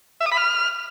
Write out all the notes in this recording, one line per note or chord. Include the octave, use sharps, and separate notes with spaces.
E5
D#6
B5
F6